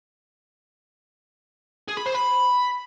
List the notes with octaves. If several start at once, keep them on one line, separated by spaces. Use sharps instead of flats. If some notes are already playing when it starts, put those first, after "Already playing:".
G#4
B5
C5
B5